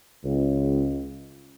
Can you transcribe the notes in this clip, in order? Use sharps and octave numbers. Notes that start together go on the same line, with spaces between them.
C#2